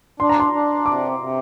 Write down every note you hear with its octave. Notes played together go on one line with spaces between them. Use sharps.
D4 C6
A#5
C6
D4
C3 D6
C3